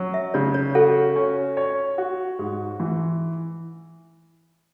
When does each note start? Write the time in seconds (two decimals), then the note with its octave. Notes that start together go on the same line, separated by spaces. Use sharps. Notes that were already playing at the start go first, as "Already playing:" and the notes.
Already playing: F#3 C#4
0.14 E5
0.34 C#3 C#5
0.54 C#5
0.75 F#4 A4
1.16 C#4
1.57 C#5
1.98 F#4
2.39 G#2
2.80 E3